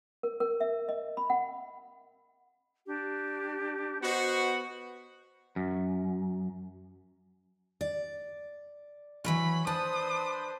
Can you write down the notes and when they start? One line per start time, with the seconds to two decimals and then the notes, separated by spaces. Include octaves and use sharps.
0.23 A#4
0.40 A#4
0.61 E5
0.89 D#5
1.17 B5
1.30 F#5
2.85 D4 G4
4.02 B3 F#4 C5 D#5
5.56 F#2
7.81 D5
9.24 E3 F#3 C#5 B5
9.67 D4 B4 C5 A5 D#6